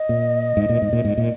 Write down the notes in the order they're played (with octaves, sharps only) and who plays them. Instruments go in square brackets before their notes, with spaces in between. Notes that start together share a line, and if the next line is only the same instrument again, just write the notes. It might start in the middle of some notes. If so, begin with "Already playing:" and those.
Already playing: [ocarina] D#5
[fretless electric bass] A#2
G#2
A#2
G#2
A#2
G#2
A#2